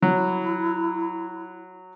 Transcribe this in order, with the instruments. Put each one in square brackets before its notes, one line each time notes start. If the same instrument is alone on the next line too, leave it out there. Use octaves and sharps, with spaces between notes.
[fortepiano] F#3 [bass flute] E4